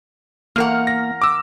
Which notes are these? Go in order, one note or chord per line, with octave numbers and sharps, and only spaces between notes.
E2 A#3 A#4 F#5 F6
A#6
D6 E6